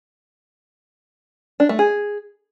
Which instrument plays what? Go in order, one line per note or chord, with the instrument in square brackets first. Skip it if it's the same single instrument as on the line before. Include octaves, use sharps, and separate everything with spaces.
[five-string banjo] D4
A3
G#4